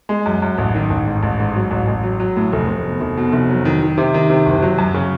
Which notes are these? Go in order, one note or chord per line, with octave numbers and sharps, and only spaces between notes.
G#3
F#2
F#2
A1
D#3
A1
G#2
A1
G#2
F#3
A1
A1
F#3
F#3
A2
F1
F1
B2
F1
B2
F1
F#3
D#3
D#3
C3
D#3
C3
F#1
F#3
F#2
C#3